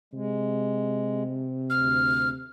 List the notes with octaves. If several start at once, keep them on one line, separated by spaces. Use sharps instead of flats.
C3 G#3
D2 F6